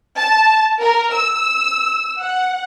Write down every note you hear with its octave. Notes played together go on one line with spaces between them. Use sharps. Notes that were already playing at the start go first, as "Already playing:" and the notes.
A5
A#4
E6
F#5